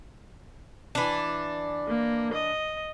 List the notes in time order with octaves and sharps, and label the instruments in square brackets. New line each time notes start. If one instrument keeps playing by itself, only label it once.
[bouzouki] E3 D4
[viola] A#3
D#5